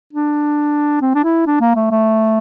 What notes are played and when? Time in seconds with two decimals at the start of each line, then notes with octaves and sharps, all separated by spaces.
0.13 D4
1.01 C4
1.15 D4
1.24 E4
1.47 D4
1.61 A#3
1.76 A3
1.91 A3